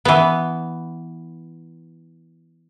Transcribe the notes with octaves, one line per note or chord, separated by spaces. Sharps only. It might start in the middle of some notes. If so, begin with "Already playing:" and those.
E3 B3